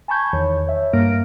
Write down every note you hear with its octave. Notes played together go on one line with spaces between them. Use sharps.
G#5 A5 B5 C#6 G6 G#6
E2 D#3 C#5
C#5 E5
G2 A#3 F6 A#6 D7